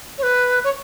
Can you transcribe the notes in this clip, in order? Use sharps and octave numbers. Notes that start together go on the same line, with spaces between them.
C#5
B4
C#5